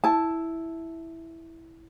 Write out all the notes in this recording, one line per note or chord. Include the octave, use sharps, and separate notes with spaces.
E4 A5